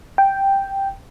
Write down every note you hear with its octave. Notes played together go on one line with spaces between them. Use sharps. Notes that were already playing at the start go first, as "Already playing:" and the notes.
G5